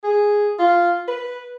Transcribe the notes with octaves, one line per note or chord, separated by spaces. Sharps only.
G#4
F4
B4